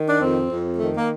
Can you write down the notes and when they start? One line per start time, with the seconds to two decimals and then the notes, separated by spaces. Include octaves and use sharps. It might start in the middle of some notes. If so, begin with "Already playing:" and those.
Already playing: D#3
0.09 D4
0.21 F2 C4
0.50 F2
0.79 D#3 A3
0.97 A#3